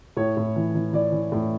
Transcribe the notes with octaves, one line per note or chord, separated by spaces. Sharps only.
A2 C#5
A2
E3
E3
E3 D5
E3
A2